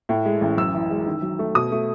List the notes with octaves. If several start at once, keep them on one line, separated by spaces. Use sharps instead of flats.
A2
G#3
A1
F#2 E6
E3
G#3
D#3
F#3
A3
B2 D#6
A3